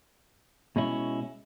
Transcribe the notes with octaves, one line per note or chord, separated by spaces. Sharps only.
B2 G#3 C#4 E4